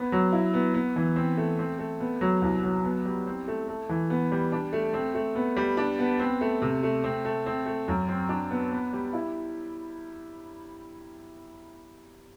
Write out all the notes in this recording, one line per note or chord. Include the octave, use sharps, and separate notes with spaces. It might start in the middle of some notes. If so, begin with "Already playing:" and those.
Already playing: B3
F#3
E4
B3
B3
E3
C4
A3
C4
A3
B3
F#3
C2
F#3
B3
G3
C4
A3
A3
E3
B3
G3
D4
A3
C4
A3
B3
G3
D4
B3
C4
A3
C3
A3
C4
A3
C4
A3
F#2
C4
D4
B3
B3
G3
E4